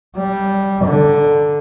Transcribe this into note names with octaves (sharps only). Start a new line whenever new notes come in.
G3
D3